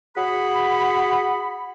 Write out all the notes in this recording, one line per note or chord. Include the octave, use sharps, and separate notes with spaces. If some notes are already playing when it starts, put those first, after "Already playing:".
F#4 G#4 B5